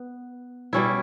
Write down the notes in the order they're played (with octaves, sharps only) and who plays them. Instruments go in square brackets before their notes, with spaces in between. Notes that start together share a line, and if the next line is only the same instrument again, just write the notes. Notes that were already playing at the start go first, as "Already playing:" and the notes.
Already playing: [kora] B3
B2 G3 C#4 E4